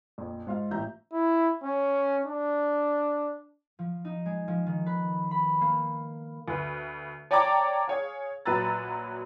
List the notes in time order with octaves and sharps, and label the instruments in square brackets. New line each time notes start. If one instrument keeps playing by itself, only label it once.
[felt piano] A#1 F2
G#2 F4 F5
A1 A#2 E5 A#5 G6
[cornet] E4
C#4
D4
[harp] F3
D#4
G#3
F3
D#3
B4
B5
A#3
[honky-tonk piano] D2 B4
C#5 D5 G5 A5 A#5 D6
G#4 C#5 F5
A#1 F#3 B4 A#5 E6 A6